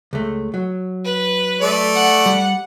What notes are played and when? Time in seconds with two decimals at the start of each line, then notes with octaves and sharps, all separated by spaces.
0.13 C#2 A3
0.54 F#3
1.05 B4
1.61 A3 D5
1.95 F#5
2.26 G3